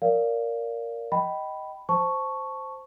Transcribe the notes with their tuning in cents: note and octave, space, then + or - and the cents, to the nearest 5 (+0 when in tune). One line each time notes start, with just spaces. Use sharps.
A#4 +0 D5 -20 F5 +0
D#5 +5 G5 -20 B5 +0
C5 -5 A5 +0 C#6 +0